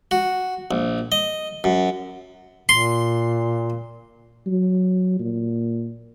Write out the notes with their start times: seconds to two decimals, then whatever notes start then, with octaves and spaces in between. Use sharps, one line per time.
0.11 F#4
0.71 A#1
1.12 D#5
1.64 F#2
2.69 A#2 C6
4.46 F#3
5.20 A#2